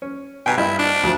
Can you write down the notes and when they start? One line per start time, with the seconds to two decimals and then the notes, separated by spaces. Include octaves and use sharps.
0.02 C#4
0.46 B2 G5 G#5 A#5
0.57 G2 E4 F4 D#5
0.79 D4
1.03 D2 F3